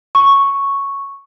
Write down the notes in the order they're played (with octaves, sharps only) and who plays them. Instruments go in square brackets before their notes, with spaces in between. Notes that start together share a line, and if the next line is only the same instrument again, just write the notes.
[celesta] C#6